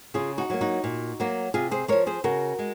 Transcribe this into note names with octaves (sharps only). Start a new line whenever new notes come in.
C#3 F4 G#4
D#4 F#4
F#3 A#3
D#4 F#4
A#2
F#3 A#3
C3 F4 G#4
G#4 C5
F3 G#3 A#4 C#5
G#4 C5
C#3 F#4 A#4
G#3